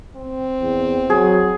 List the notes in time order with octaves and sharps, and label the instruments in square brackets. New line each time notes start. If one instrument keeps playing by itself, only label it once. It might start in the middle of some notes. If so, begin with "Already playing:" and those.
[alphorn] C4
[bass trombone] E2
[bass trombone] F#3 [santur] G#4